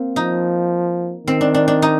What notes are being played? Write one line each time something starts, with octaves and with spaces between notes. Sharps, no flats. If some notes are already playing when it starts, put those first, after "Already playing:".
Already playing: A#3 C4
F3 D#4
D#3 C4
D4
D4
D4
D#4